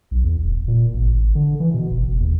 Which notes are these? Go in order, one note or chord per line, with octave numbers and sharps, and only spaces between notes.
B1
E2
D#1
A#2
G#1
G#1
D3
E3
B2
F#1
F#1
D#2